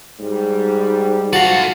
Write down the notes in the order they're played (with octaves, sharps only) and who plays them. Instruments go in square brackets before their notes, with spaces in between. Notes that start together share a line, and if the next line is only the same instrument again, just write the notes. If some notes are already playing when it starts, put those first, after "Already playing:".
[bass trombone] G#2 [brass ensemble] G3
[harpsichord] F#4 [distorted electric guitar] A4 F5